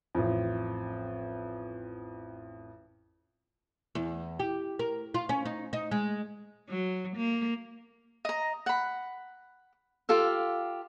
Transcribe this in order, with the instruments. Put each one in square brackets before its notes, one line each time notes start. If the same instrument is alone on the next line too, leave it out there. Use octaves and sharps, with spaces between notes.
[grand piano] A1 F2
[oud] E2
G4
A#4
F4
C#4
D#4
D#4
G#3
[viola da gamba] F#3
A#3
[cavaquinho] D#5 A#5
F#5 B5
F4 G4 A4 F5